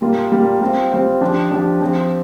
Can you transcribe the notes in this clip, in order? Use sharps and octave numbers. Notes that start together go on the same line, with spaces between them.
A#2 G3 A#3 F4
A#2 G3 A#3 F4
G3 C4 F4
G3 C4 F4
F3 D4 G4
F3 D4 G4
F3 C4 G4